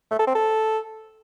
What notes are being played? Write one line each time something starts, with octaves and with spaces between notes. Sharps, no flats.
A3
A4
C4
A4